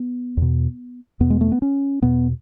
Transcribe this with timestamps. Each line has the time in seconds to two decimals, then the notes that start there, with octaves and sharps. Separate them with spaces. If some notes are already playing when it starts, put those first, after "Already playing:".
Already playing: B3
0.37 E2 B2
1.20 E2 B2 B3
1.30 G#3
1.41 A3
1.52 B3
1.62 C#4
2.02 E2 B2 B3